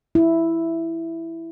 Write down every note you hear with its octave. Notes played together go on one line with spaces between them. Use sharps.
E4